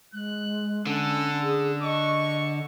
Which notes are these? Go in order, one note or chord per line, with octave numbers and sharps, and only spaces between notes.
G#3 F#6
D3 C#4 A4
G#4
D#5 C#6